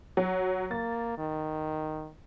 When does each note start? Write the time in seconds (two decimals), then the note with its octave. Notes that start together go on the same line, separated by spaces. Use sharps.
0.17 F#3
0.71 A#3 A6
1.18 D#3